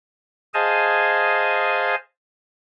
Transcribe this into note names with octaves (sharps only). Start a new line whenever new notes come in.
G#4 C5 D#5 F5 G#5 A5